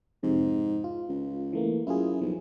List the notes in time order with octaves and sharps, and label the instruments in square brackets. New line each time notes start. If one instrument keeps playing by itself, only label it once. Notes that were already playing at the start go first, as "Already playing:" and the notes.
[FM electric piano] F2 C3 [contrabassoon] G#2
[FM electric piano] F4
[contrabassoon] C#2
[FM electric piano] E3 A3 A#3
[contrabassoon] F#2 [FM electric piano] E4 F4 G#4
[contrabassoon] B1 [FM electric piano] F3